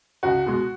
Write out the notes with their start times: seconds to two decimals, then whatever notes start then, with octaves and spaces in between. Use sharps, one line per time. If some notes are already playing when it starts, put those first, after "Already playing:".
0.23 C#2 F#4
0.46 B2 G#3